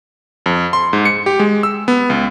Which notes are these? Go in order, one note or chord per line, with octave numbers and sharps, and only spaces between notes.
F2
C6
G#2
C#7
G4
G#3
E6
B3
C#2